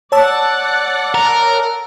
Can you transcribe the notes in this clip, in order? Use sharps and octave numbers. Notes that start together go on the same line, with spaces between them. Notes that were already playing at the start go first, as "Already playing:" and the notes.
C#5 D5 F#5 A5 E6
A#4